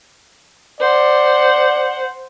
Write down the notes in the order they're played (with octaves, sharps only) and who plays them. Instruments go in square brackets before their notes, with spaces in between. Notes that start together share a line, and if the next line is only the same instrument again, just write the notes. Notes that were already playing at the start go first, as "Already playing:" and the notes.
[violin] C5 F#5 [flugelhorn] D5